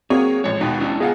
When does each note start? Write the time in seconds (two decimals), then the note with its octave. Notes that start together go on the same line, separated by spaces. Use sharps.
0.10 F#3 A#3 C4 G#4 C#5
0.44 A1 F3 G#3 C#5
0.61 D#2 B2 D#4 F#4
0.80 C#4 D4 E4
1.00 B3 F4 G#4 D#5 F5 F#5